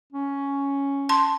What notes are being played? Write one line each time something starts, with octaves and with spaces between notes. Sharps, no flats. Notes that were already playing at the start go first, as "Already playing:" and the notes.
C#4
A5 C6